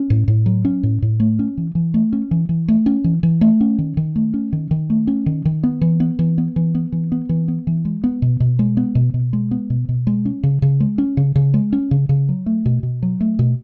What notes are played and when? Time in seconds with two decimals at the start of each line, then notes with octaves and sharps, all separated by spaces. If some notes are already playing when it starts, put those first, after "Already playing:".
Already playing: C#4
0.10 A2
0.28 A2
0.46 F#3
0.65 C#4
0.83 A2
1.02 A2
1.20 A3
1.39 C#4
1.57 E3
1.75 E3
1.94 A3
2.13 C#4
2.31 E3
2.49 E3
2.68 A3
2.86 C#4
3.04 E3
3.23 E3
3.41 A3
3.61 C#4
3.79 D#3
3.97 D#3
4.16 A3
4.34 C#4
4.53 D#3
4.71 D#3
4.90 A3
5.07 C#4
5.26 D#3
5.45 D#3
5.64 B3
5.81 E3
6.00 B3
6.19 E3
6.38 B3
6.56 E3
6.75 B3
6.92 E3
7.12 B3
7.29 E3
7.48 B3
7.67 E3
7.85 G#3
8.04 B3
8.22 B2
8.40 B2
8.59 G#3
8.77 B3
8.95 B2
9.14 B2
9.33 G#3
9.51 B3
9.70 B2
9.89 B2
10.07 G#3
10.25 C#4
10.43 C#3
10.62 C#3
10.80 G#3
10.98 C#4
11.17 C#3
11.36 C#3
11.54 G#3
11.73 C#4
11.91 C#3
12.09 C#3
12.29 F#3
12.46 A3
12.66 B2
12.83 B2
13.03 F#3
13.21 A3
13.39 B2